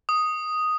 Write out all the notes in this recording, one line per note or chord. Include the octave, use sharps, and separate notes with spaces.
D#6